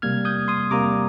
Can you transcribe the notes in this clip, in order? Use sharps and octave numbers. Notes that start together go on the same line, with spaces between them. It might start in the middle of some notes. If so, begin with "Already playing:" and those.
C3 G3 A#3 F6 G#6
D#6 G6
C6 D#6
C3 G3 A#3 A#5 D6